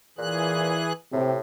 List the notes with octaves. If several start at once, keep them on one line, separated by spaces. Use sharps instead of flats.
A#2 E3 G#4 F#6
A2 C3